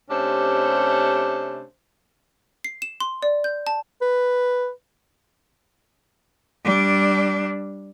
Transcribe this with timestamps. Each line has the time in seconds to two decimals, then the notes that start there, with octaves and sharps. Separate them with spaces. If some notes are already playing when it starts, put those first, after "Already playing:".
0.10 C3 A3 C#4 D4 G4 C5
2.64 C7
2.82 E7
3.00 C6
3.23 D5
3.44 G6
3.67 A5
4.02 B4
6.64 G3 D4